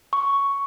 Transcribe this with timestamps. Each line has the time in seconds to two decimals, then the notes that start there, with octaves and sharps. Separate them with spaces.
0.13 C#6